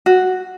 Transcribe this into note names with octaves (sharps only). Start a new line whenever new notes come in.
F#4